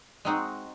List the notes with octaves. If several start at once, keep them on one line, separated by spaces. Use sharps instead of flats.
G#3 C4 D#4 F#4